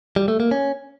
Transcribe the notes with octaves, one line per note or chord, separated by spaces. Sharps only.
G3
A3
A#3
C#4